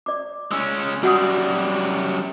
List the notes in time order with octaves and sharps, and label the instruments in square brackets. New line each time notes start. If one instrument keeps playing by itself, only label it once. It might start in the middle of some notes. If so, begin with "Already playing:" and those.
[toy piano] D5 D6
[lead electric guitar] G#3 C#4 [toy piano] E6
[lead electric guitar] F#2 G3 [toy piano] F#4 F#5 D#6